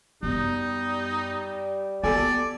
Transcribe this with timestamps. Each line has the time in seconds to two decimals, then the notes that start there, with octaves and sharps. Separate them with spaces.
0.23 F#2 G3 B3 D#4
2.04 B3 G4 A4 D5 G#5